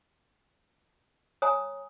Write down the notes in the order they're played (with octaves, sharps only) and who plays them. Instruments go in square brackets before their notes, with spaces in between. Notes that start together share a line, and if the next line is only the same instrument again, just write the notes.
[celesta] C#5 [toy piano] G#5 A#5 D#6